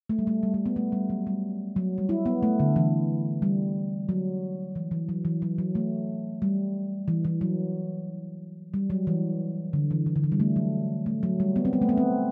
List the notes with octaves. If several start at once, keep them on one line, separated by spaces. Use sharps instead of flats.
A3
G3
A3
G3
A3
B3
A3
G3
F#3
G3
F#3
G3
E4
B3
A3
D3
E3
G3
F#3
E3
E3
F#3
E3
F#3
F#3
A3
G3
E3
E3
F#3
G3
F#3
E3
D3
E3
E3
D3
E3
G3
A3
F#3
A3
F#3
G3
B3
C4
B3
A3
B3
C4